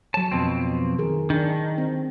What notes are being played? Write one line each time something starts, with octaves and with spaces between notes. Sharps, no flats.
F#3 C#5 A5
F2 B2 C4
D#3 G#4 A#4
D#3 D4
C4